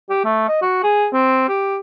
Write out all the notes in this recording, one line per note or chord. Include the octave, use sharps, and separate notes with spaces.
G4
A3
D#5
F#4
G#4
C4
G4